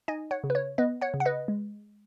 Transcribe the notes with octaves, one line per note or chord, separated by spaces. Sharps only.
D#4 D#5 G#5
C#5 F#5
C#3
B4
C#5
B3 B4 D#5
C#5 F#5
C#3
F#5
B4 D#5
G#3